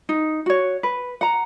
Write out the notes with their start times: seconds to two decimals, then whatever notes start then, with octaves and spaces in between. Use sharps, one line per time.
0.09 D#4
0.46 F#4 C#5
0.83 B4
1.21 F#5 A#5